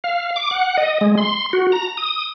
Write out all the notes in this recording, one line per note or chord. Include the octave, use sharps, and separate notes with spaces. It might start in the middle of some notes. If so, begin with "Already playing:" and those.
F5
D6
F#5
D#5
G#3
C6
F#4
A#5
D#6